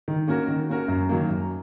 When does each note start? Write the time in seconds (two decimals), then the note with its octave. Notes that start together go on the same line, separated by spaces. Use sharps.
0.08 D#3
0.28 A#3 C#4 F#4 A#4
0.48 D#3
0.69 A#3 C#4 F#4 A#4
0.88 F#2
1.09 D#3 F#3 A#3
1.29 F#2